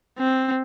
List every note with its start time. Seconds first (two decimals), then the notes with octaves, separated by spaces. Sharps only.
0.19 C4